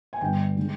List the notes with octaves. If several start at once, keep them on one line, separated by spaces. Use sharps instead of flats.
G#5
G1 G2 D3 G5
D3 G#3